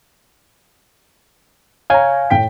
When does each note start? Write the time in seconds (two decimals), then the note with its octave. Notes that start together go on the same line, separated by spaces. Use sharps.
1.90 C#5 F5 G#5 A#5
2.30 A2 G5 B6